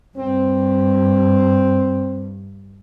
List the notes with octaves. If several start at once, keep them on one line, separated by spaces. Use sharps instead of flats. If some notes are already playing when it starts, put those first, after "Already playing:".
G2 C4